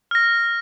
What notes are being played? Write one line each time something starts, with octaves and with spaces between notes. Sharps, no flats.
F6 A#6